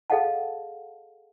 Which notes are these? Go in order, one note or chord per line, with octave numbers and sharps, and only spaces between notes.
G#4 A4 D#5 F5 F#5 A5